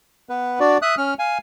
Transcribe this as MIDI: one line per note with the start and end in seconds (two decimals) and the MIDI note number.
0.29 0.60 59
0.29 0.60 71
0.60 0.78 62
0.60 0.78 66
0.60 0.78 74
0.82 0.95 76
0.82 0.95 87
0.82 0.95 90
0.97 1.14 61
0.97 1.14 89
1.19 1.38 77
1.19 1.38 80